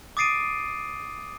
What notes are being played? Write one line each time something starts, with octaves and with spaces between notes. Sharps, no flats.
D6 D#6 A6 C7 D7 D#7